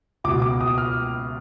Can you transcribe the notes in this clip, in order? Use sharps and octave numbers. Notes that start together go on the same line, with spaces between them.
C#2 B2 D6
D6
D#6
F6